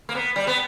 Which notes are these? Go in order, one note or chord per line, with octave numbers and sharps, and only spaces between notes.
A#3
B3
G3
B3